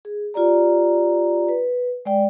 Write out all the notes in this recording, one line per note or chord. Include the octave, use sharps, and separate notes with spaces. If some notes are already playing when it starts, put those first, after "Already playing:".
G#4
F4 G4 D5 A#5
B4
G#3 D5 G5